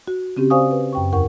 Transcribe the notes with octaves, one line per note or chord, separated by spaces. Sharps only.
F#4
C#3 C4 C#4 G4
C5 D5 F5 G#5 C#6 D#6
B4
F#2 G5 C#6
E2 A#4 F#5 C#6